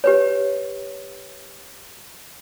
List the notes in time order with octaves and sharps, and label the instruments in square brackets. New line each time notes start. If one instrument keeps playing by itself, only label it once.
[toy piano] G4 B4 C#5